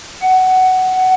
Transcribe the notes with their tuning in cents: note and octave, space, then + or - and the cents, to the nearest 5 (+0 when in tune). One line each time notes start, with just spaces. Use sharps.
F#5 +15